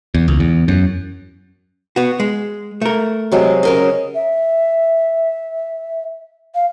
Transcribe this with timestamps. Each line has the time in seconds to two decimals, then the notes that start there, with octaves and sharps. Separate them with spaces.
0.15 E2
0.28 C#2
0.40 E2
0.68 F#2
1.96 B3 F#4
2.20 G#3
2.81 A3 A#4
3.32 C3 F#3 G#3
3.63 C#3 A#4 D#5
4.15 E5
6.55 F5